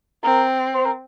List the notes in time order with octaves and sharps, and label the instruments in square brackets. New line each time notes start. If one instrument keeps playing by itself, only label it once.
[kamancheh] C4 [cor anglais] A#4
[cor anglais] C5
A#4